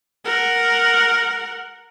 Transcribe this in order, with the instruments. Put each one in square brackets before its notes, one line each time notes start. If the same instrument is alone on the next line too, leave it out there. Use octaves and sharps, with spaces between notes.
[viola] A#4 F#5